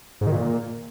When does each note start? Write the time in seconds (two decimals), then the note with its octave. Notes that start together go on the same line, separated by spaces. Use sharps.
0.21 G#2
0.27 D#3
0.32 A#2